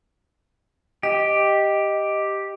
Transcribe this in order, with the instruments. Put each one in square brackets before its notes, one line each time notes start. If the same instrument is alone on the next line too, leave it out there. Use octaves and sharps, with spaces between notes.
[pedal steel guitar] G4 [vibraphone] D#5